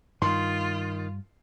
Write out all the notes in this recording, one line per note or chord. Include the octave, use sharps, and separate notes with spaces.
G2 D#3 G3 F4 C6